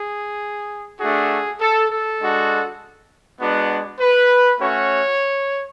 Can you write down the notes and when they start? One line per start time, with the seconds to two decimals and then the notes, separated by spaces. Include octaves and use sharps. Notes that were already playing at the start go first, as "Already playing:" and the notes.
Already playing: G#4
0.99 A3 D4 F#4 G#4
1.60 A4
1.90 A4
2.20 G#3 D4 F#4
3.40 G#3 B3 D4 F#4
4.00 B4
4.60 A3 C#4 F#4 C#5